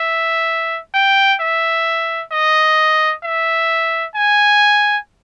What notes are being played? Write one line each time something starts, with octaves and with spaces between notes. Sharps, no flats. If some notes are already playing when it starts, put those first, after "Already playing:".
Already playing: E5
G5
E5
D#5
E5
G#5